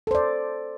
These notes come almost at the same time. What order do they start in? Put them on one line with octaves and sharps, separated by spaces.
A4 C5 D5